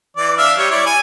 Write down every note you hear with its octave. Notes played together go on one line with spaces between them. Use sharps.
E3 D5
D4 E5 F5
G3 C#5
E4 C#5 D5
G#5